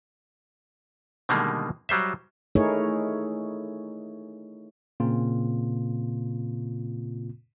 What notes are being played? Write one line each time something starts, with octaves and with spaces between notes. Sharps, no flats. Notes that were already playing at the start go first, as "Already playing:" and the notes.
B2 D3 D#3 G3 G#3 A#3
F#3 G3 C5 E5
A3 D#4 E4 G#4 A#4 C#5
A#2 C#3 A#3 C4 F4